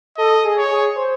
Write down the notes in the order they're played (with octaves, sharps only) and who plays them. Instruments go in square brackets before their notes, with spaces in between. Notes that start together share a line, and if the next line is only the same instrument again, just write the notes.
[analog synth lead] A4 [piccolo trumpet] D#5
[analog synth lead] G#4
[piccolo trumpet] C#5
[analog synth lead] G#4
C5